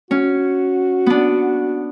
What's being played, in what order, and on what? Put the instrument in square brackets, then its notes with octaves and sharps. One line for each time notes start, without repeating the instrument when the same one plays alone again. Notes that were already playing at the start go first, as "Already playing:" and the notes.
[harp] C#4 [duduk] F#4
[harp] B3 D4